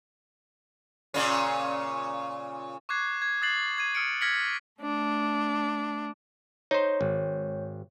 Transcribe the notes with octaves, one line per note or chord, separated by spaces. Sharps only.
A#2 C#3 C#4
C#6 D6 F#6 G#6 C7
G#6
D#6 F#6 A6 C7 F#7
G#6 D#7
D#6 F6 C#7 D7
F6 G#6 A#6 B6 C#7 F#7
A3 D4
D#4 C5 C#5
G#1